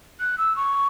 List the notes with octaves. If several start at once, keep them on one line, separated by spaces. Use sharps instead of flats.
F#6
E6
C#6